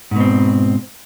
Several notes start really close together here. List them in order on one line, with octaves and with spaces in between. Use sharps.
G#2 B2 C4